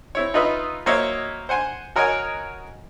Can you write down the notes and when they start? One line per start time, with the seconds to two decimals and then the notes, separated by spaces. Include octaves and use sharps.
0.15 C4 E4 C#5
0.34 D#4 F4 B4 D#5 E5
0.86 F#3 A#3 C5 C#5 D#5 E5
1.49 C5 F#5 G#5 C6
1.96 F#4 A#4 C#5 D#5 F#5 G#5